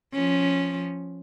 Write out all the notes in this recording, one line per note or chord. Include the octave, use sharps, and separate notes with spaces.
F3 C#4